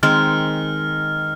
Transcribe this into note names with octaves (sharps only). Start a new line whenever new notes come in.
D#3 G#3 C4 F6